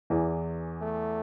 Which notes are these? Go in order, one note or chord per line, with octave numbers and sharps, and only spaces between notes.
E2 E3
A3